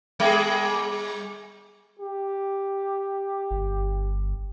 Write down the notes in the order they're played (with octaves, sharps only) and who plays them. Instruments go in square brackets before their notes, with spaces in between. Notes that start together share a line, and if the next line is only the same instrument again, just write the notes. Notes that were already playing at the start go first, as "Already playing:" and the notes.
[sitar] G3 G#4
[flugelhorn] G4
[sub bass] G1